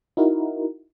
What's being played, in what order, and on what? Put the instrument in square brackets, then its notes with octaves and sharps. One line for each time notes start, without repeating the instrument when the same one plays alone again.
[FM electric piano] D#4 E4 F#4 A#4